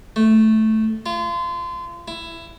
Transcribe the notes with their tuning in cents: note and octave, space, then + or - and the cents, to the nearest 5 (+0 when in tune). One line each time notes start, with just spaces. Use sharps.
A3 -5
F4 -30
E4 +15